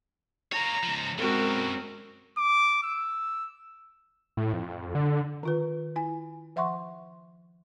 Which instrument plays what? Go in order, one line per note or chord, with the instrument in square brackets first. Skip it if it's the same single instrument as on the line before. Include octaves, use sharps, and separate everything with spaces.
[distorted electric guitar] A#3 C#5 [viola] A#5
[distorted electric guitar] C#2 F3
[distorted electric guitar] F#2 B2 [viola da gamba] G#3 C4 [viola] F#4 A#4
[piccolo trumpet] D6
E6
[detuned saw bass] A2
F2
D3
[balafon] D#3 F4 B4
E4 G#5
F3 E5 F#5 C6 C#6